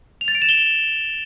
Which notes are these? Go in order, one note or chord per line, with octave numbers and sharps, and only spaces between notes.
F7
A6
D7
E7
G7